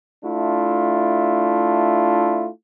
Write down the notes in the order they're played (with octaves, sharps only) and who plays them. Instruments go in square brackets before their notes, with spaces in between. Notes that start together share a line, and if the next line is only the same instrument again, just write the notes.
[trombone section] A3 D4 E4 F4